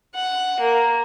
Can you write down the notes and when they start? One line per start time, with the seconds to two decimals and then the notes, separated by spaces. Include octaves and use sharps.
0.14 F#5
0.60 A#3